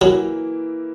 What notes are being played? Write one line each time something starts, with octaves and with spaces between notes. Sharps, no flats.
E3 F#3 A#3 E4